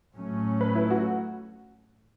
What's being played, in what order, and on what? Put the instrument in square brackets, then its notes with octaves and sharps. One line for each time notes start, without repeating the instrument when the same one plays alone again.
[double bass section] A2 F#3 A3 C#4
[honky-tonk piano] B4
E4
F#4